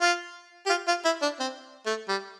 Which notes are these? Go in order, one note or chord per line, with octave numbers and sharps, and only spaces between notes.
F4
G4
F4
F4
E4
D4
C4
A3
G3